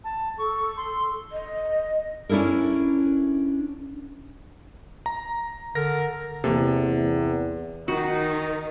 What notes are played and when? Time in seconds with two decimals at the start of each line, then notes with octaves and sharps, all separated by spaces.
0.04 A5
0.38 A4 C#6
0.77 C6
1.32 D#5
2.29 C#4 D4 E4 A4 A#4
5.06 A#5
5.75 D3 A#4 A#6
6.44 E2 C3 E3 A#3 A4
7.88 D#3 D#4 F#4